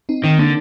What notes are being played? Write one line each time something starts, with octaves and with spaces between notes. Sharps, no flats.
C4 D#4
D#3 C4 D#4
D3 A#3 D4